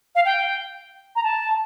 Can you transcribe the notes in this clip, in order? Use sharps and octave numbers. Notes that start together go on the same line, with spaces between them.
F5
G5
A#5
A5